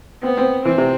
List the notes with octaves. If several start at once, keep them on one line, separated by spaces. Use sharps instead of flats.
B3 C4
C4
E3 C4
C3